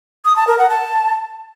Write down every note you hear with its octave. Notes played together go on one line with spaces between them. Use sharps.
D#6
A5
A#4
F#5
A5